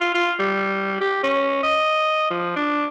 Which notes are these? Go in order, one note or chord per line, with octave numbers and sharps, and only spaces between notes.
F4
F4
G3
G4
C#4
D#5
F3
D4